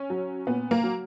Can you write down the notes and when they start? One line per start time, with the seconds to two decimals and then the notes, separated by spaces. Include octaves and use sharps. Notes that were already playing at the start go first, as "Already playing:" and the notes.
Already playing: C#4
0.10 F#3
0.47 A#2 B3
0.71 A#3
0.84 F#3